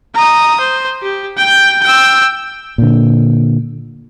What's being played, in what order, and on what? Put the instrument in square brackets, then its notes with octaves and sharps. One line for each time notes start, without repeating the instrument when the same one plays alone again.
[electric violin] A#5 D#6
C5
G4
G5 G6
G5 E6
[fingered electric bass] A#2 D3